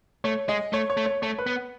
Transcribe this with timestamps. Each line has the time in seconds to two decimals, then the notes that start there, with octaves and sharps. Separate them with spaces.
0.24 A3 C#5
0.49 G#3 D#5
0.73 A3 C#5
0.90 C#5
0.97 A3
1.06 C#5
1.22 A3 C#5
1.39 B4
1.47 B3